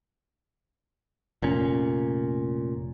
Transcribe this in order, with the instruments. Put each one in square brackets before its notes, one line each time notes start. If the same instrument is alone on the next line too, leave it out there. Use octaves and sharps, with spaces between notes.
[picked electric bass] F1 A#2 C#4